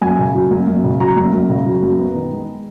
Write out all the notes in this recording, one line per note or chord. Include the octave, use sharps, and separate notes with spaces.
F#2 G#5
C#3
F#3
F#2
F#2
C#3
F#3 A#5
F#2
F#2
C#3
F#3
F#2
B3
D#3
G#3